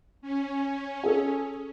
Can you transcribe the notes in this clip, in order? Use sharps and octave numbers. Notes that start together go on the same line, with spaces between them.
C#4
G#4 A4